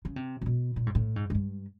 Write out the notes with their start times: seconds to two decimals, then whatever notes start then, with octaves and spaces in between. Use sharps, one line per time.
0.05 C#3
0.16 C3
0.41 A#2
0.46 B2
0.76 A#2
0.86 G#2
0.95 A2
1.16 G#2
1.30 G#2
1.35 G2